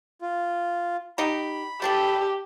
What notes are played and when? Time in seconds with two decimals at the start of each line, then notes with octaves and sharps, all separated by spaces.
0.22 F4
1.18 D#4 G4 B5
1.82 G3 D4 G4 A4